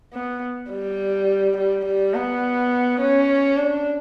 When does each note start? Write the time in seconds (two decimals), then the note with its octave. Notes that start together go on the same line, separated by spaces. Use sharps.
0.13 B3
0.71 G3
1.57 G3
1.86 G3
2.14 B3
3.01 C#4
3.57 D4